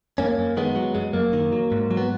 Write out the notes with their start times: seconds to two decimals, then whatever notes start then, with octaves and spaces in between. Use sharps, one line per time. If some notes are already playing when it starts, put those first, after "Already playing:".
0.18 F#2 A#3 C#4
0.38 F#2
0.57 D#3 G#3 B3
0.76 F#3
0.95 F#2 G#3
1.13 F#2 A#3
1.33 D#3
1.52 F#3
1.72 G#2
1.91 F#3
1.97 B3